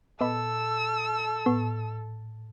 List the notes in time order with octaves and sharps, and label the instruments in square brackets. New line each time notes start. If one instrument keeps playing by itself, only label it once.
[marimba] A#2 [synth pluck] B3 D#5 B5 [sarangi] A4 [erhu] E6
[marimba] A2 [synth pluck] B3